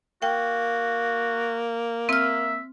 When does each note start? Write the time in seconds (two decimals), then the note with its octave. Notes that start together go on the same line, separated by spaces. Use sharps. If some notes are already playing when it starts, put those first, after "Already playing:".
0.22 A#3 F#4 G5
2.09 C4 E5 F6